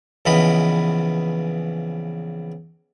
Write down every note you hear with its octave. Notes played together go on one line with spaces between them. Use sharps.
A#1 C#3 E3 B3 D#5 B5